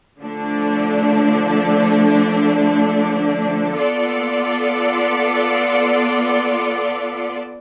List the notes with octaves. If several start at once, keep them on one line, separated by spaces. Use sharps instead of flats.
D3 F3 A3 D4
B3 F4 A4 D5